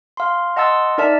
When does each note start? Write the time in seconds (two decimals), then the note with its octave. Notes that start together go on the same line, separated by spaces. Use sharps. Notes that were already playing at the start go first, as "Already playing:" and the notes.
0.17 F5 C6
0.56 D#5 F#5 A5 C6 E6 A6
0.98 D#4 A#4 D5 E5 A5